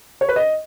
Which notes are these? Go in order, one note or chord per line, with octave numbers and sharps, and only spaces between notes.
C#5
B4
D#5